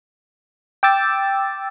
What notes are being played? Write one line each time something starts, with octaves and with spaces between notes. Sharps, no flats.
G5 D6 E6 A6